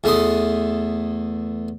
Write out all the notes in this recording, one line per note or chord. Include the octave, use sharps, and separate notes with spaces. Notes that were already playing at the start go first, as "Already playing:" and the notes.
E2 A3 C6 D#6